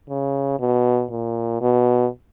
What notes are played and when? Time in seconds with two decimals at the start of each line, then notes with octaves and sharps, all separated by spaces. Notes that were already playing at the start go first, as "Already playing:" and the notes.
0.09 C#3
0.59 B2
1.10 A#2
1.61 B2